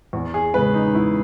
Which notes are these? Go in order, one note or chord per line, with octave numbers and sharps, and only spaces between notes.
E2
G#4
C#3 G#3 B4
D#4
E2 E4